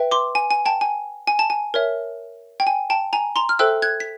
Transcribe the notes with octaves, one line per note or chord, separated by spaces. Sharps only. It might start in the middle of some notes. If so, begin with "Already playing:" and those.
Already playing: B4 E5 G5
C6 D6
G#5
G#5
G5 A5
G#5
G#5
A5
G#5
A#4 C#5 E5
G5
G#5
G5 A5
G#5 A#5
A#5 C6
F6
A4 C5 E5 G5 E6 F#6
F#6 G#6
B6